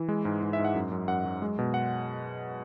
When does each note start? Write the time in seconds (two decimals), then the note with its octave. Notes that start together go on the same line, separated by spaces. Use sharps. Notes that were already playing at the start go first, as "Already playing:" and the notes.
Already playing: E3
0.08 G#3
0.25 G#2
0.43 G#2
0.53 E5
0.59 G#2
0.65 F#5
0.75 F#2
0.91 F#2
1.08 F#2 F#5
1.25 F#3
1.42 G#3
1.59 B2
1.74 F#5